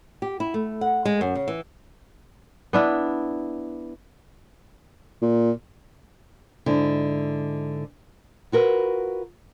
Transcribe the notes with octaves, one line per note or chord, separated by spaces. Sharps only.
G4
E4
A3
F#5
G#3
F#2
C#3
E3
B3 D4 E4
A#2
G#2 D3 E4
F4 F#4 A#4 B4